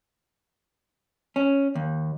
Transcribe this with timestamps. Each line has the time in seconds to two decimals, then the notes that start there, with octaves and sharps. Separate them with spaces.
1.36 C#4
1.75 D#2